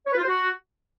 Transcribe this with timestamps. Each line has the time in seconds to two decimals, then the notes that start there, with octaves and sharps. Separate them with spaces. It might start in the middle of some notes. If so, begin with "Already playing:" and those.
0.06 C#5
0.12 B4
0.17 F4
0.22 C5
0.27 F#4